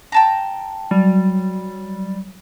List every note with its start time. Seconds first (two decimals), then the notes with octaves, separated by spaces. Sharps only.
0.12 G5 A5 A#5
0.91 F#3 G3